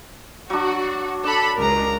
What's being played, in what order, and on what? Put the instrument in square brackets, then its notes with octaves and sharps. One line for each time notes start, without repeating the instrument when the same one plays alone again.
[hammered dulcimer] F#3 D4 [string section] F#4
[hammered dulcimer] D4 [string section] A4 B5
[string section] C#2 [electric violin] A#4 A#5